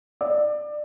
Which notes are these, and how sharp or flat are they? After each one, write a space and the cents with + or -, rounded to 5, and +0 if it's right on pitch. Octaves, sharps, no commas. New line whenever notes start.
D5 +25